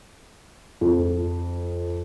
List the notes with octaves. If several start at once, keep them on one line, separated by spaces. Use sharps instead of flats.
F2